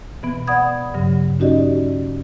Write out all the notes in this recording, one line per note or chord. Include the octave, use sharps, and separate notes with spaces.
B2 E3 B3
D5 F#5 B5 D#6 G#6
G2 C#3 F#3
C#4 D#4 F#4 G4 D5 D#5